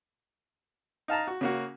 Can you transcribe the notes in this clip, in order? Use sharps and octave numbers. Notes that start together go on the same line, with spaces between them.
D#4 F5 A5 A#5
F#4
C#3 A#3 F#4